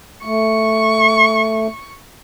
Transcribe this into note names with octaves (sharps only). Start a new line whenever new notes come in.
A3 C#6